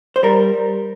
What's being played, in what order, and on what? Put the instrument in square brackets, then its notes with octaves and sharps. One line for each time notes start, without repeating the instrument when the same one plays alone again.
[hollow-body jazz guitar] C5
G3 A#4